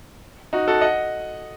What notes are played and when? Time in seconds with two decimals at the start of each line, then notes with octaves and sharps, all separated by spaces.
0.53 D#4 F#4
0.68 F#4 A4
0.81 D#5 F#5